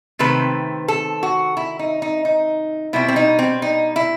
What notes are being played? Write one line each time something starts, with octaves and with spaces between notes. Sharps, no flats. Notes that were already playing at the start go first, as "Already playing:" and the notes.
C3 D#3 A3 C4 B4
A4
F#4
E4
D#4
D#4
D#4
B2 G3 C4 E4
C4
D#4
C4
D#4
E4